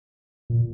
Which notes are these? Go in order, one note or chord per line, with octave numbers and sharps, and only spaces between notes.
A#2